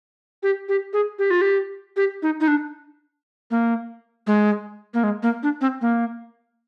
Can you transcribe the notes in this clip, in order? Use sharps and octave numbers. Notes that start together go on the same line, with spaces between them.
G4
G4
G#4
G4
F4
G4
G4
D#4
D#4
D4
A#3
G#3
A#3
G#3
A#3
D4
C4
A#3